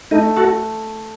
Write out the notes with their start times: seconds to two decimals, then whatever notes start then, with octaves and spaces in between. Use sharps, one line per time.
0.11 A3 D#4
0.37 F#4 A4